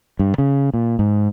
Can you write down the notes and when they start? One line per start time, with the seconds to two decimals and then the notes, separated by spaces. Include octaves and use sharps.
0.19 G2
0.38 C#3
0.74 A#2
0.99 G#2